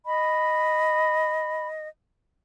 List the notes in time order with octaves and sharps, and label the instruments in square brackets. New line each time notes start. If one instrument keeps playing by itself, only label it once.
[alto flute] D#5 [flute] B5